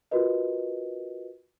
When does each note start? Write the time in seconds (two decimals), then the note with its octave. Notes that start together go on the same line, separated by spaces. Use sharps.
0.11 F4 F#4 A#4 B4 D#5